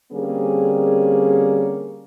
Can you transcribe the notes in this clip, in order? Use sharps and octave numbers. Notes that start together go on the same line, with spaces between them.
D3 G3 A#3 C4 C#4 G#4